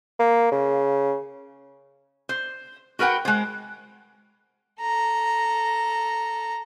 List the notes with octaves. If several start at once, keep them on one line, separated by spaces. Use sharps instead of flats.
A#3
C#3
C5
F#4 A#4 B4 F#5 G5
G#3 C5
A4 A#5